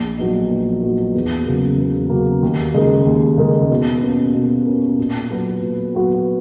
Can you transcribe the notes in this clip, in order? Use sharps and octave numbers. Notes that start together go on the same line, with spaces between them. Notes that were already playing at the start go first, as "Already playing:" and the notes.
Already playing: A#1
A#2 F#3 B3 D#4
A#1
A#2 F#3 B3 D#4
E2
C#3 F#3 A#3
E2
C#3 F#3 A#3
D#2
C#3 G#3 D#4 A#4
D#2
C#3 G#3 D#4 A#4
B2
A#3 C#4
B2
A#3 C#4
A#2
F#3 B3 F#4 B4
A#2
F#3 B3 F#4 B4